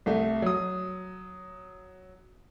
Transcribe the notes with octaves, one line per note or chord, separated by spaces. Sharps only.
C2 A3
F#3 D#6